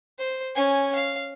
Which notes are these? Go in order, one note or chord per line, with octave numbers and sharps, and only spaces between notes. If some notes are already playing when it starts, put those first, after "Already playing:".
C5
C#4 G#5
F5